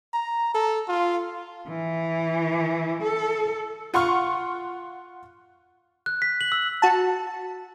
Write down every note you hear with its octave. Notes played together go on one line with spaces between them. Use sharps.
A#5
A4
F4
E3
A4
F4 F#5 C6 C#6 F6
F#6
B6
F#7
E6
F#4 A5